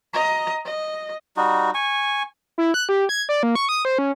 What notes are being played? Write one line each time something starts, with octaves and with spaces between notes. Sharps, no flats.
D#5 A#5
D#5
G3 D#4 F#4
G#5 C#6
E4
F#6
G4
G#6
D5
A#3
C#6
D#6
C5
C#4